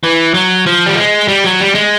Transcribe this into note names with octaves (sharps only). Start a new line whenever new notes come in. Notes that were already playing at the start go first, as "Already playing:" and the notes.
E3
F#3
F3
G3
G#3
G3
F#3
G3
G#3